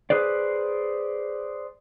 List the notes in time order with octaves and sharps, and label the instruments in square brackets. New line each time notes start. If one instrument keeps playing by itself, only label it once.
[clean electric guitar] G#4 B4 C5 D5